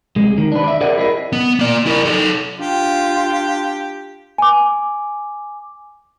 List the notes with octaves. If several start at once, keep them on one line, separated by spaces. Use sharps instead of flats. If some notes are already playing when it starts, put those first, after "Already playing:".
C2 G#3
D#3
D4 B4
D5 E5
G#4 A#4 C5 D5 D#5 F#5
E4 G#4 A#4 D#5
B3
A#3 D5
E4 A#4
D#4 A4
D4 F4 G4
G#5 D6